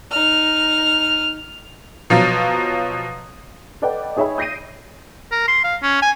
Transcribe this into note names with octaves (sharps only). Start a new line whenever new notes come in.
D#4 F6
B2 F3 F#3
A4 B4 D5 D#5 F#5 G5
D#4 G#4 C#5 E5 G5 B5
D#6 G6 A#6 C7 D7 D#7
A#4
C6
F5
C#4
G#5